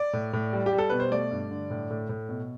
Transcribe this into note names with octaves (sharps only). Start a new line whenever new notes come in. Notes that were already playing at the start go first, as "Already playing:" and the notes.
Already playing: D5
A2
A2
G3
G4
G3
A4
B2 B4
C5
A3 D5
G2
D3
A2
A2
A2
B2